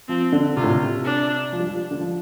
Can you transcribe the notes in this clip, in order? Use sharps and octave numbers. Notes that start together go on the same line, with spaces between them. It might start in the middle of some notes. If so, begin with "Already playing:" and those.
F3 C4
D3
C3 F4
A2
C3
D4
F3
G3
F3
G3
D3
F3